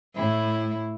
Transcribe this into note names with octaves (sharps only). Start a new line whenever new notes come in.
A2 E4